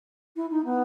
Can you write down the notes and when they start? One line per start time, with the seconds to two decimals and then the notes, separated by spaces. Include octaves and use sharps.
0.36 E4
0.50 D#4
0.65 B3